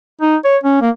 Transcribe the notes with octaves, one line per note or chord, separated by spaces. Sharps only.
D#4
C#5
C#4
A#3